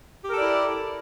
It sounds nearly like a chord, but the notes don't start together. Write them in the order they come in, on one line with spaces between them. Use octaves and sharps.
G4 A#4 A4 D5 E4